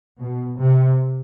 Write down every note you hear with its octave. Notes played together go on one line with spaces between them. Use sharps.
B2
C3